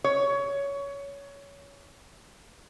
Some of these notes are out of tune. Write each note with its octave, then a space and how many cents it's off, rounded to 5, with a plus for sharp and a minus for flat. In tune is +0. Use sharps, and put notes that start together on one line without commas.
C#5 +20